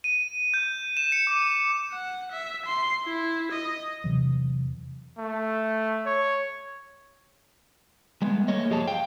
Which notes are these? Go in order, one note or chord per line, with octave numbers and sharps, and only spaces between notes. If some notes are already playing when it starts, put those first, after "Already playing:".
D#7
G6
E7
C#7
D6
F#5
E5
C6
E4
D#5
E2 C3 E3 F#3
A3
C#5
G3 G#3 B3
A3 A#3 C#5 D#5
F#2 F3 G4 G#4 C#5 A5
F5 G5